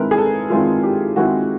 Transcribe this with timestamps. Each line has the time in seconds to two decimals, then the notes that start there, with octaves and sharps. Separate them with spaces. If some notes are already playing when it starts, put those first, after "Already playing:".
Already playing: D#3 G#3 C4 E4 A#4 B4
0.11 G#4
0.18 A4
0.50 D#3 G#3 C4 E4 F4
0.83 G4
1.16 D#3 G#3 C4 E4 F#4